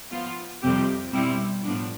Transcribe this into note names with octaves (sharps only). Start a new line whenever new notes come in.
F3 B3 F4
F2 C3 G3 C4 G4
B2 G3 C4 E4
A2 F3 B3 D4